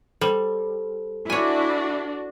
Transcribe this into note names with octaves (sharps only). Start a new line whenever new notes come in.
G3 A4 C5
D4 E4 F#4 C#5 G#5